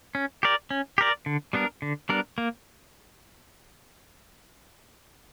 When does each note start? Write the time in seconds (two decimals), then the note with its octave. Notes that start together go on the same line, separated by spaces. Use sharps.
0.15 C#4
0.43 G4 A#4 D5
0.71 C#4
0.98 G4 A#4 D5
1.26 D3
1.53 G3 B3 D4 A#4
1.82 D3
2.09 G3 B3 D4 A#4
2.38 A#3